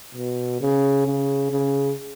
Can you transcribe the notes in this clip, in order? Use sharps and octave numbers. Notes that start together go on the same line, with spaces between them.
B2
C#3
C#3
C#3